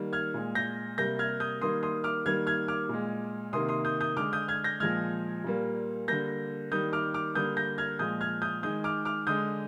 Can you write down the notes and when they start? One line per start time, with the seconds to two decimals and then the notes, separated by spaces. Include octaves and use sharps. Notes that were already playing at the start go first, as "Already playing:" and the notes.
Already playing: D#3 G3 A#3
0.13 F6 G#6
0.34 A#2 G#3
0.55 G6 A#6
0.98 C3 G3 A#3 G6 A#6
1.19 F6 G#6
1.40 D#6 G6
1.61 D#3 G3 A#3 C6 D#6
1.83 C6 D#6
2.04 D6 F6
2.25 D#3 G3 A#3 F6 G#6
2.47 F6 G#6
2.68 D6 F6
2.89 A#2 G#3
3.53 C3 D#3 A#3 C6 D#6
3.69 C6 D#6
3.85 D#6 G6
4.01 D#6 G6
4.17 D3 G#3 D6 F6
4.33 D#6 G6
4.48 F6 G#6
4.64 G6 A#6
4.80 A#2 F3 G#3 F6 G#6
5.44 A#2 G3 A#3
6.08 D3 G3 A#3 G6 A#6
6.72 D#3 G3 A#3 D#6 G6
6.93 D6 F6
7.14 D6 F6
7.35 D3 G3 A#3 D#6 G6
7.57 G6 A#6
7.78 F6 G#6
7.99 A#2 F3 G#3 D#6 G6
8.21 F6 G#6
8.42 D#6 G6
8.63 D#3 G#3 D#6 G6
8.84 D6 F6
9.05 D6 F6
9.27 D3 G#3 D#6 G6